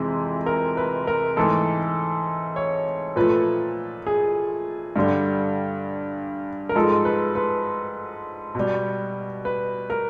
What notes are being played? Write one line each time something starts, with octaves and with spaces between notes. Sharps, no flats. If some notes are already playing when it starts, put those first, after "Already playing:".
Already playing: F2 C3 E3 G#3 E4
A#4
B4
A#4
G#2 E3 A3 A4
C#5
A#2 F3 A3 B4
G#4
G2 D3 G3
A#4
G#2 F3 G#3 A4
B4
B4
B2 G3
B4
A#4